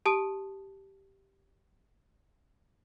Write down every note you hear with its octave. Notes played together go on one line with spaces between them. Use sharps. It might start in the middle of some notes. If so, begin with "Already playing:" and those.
G4 A5 D#6 D7